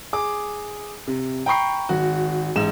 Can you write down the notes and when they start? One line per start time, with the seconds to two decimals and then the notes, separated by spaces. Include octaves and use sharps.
0.13 G#4 D6
1.07 C3
1.46 G5 A#5 B5 C#6 C7
1.89 G#1 F#4
2.56 A1 G#2 E7